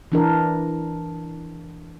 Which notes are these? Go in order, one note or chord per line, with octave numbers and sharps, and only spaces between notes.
E3 D4 A#4